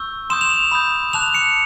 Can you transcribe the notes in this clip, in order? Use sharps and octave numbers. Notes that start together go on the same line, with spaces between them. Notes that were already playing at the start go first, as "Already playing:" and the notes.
Already playing: C#6 E6 G6
C6 D#6 G6 E7
F7
E7
B5 D#6 G6
A5 D6 F#6 F7
C#7